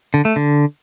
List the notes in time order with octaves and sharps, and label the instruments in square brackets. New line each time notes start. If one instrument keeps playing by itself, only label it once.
[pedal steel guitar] D3
A3
D3